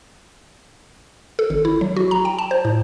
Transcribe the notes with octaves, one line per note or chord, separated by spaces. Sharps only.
A4
G#1
E4
F#3
F#4
A#5
G5
A5
C5
A2